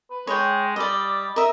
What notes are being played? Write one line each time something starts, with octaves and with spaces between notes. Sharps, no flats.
B4
G#3 C#5 G5
G3 D5 D#5
A#4 D#5 E5